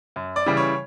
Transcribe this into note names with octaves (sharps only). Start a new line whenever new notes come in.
F#2
D5
C#3 E3 G3
C#5